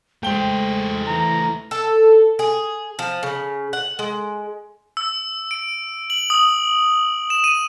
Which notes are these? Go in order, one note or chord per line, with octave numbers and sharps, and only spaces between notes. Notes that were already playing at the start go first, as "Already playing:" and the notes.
G#3 A3 C5 G5 G7
E3 A#5
A4
G#4
F3
C#3
F#5
G#3
E6
D7
F#7
D#6
E7
D#7